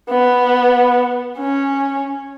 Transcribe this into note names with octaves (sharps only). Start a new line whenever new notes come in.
B3
C#4